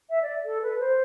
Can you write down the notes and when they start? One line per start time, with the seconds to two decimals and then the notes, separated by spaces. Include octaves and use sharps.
0.10 E5
0.22 D5
0.45 A4
0.62 B4
0.79 C5